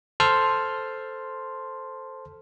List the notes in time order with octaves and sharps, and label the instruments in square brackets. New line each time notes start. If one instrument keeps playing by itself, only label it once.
[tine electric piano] A4 C5 A5 C6 F6